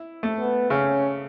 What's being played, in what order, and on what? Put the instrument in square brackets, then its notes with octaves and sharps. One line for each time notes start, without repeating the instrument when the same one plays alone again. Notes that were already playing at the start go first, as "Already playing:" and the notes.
Already playing: [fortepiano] E4
A3
[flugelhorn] B3
[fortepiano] C#3 [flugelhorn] C#4